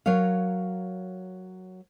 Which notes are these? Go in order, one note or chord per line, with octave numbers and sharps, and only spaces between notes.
F#3 A#4 C#5 F5